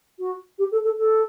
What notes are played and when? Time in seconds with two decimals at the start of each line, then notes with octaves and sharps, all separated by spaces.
0.19 F#4
0.59 G4
0.72 A4
0.84 A4
0.98 A4